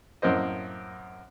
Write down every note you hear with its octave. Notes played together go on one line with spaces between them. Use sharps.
F#2 A2 A#3 C4 C5 D#5